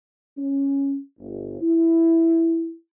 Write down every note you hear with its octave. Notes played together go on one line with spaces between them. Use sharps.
C#4
G1
E4